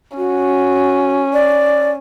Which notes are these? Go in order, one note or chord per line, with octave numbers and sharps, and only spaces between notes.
C#4 F#4
D5